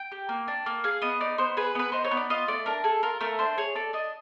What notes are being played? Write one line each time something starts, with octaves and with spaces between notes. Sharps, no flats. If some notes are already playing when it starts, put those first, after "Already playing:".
Already playing: G5
G4
A#3
D4
A#3
G#4 F5
B3 D#5
D#4 D5
B3 C5
G#4 B4
B3 B4
D#4 C5
C#5
B3
D5
F4 D#5
A3 D5
D4 A#4
G#4 A4
F4 A#4
A3 A#4
D4 C5
G#4 C#5
A4 D5
D4 D#5